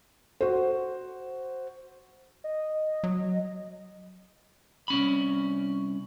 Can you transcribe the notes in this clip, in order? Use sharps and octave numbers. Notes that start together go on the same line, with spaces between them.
F#4 C5
D#5
F#3
C2 C#4 B5